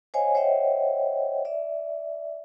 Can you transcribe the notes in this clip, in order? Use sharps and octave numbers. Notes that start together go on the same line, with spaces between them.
C5 C#5 D#5 F5 G#5
C5 C#5 D#5 E5 F#5 G5
D5 E5